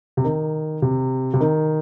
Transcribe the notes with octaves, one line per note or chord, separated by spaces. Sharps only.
C3
D#3
C3
C3
D#3